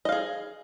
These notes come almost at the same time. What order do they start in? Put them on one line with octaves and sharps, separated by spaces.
D#5 F5 G#4